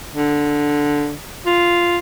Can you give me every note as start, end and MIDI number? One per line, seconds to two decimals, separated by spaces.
0.15 1.13 50
1.46 1.98 65